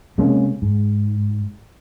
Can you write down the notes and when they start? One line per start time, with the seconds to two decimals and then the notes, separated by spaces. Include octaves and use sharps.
0.18 C3 G#3 A#3 C#4
0.62 G#2